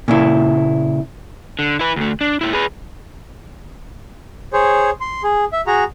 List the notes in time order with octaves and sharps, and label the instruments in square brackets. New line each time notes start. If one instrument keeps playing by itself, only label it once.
[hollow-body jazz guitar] A#2 C#3 E4
[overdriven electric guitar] D3
E4 B4
D2 A3
D4
A#2 E4
G#4 B4
[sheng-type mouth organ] G#4 C5 C#5
C6
G#4
E5
F#4 G#4 A#5